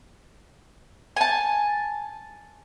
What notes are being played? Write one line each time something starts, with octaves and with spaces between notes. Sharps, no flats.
G#5 A5